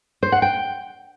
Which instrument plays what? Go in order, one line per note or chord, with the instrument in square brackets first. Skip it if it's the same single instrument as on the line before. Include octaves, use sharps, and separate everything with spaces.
[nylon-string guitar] C5
F#5
G5